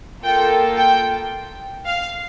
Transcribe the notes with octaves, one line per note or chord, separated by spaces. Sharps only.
A#3 F4 A4 G5
G5
F5